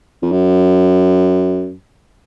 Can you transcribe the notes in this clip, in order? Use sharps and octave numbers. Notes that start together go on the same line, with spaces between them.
F2
F#2